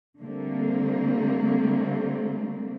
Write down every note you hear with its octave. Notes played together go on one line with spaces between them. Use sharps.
D3 G3 A3 A#3 C4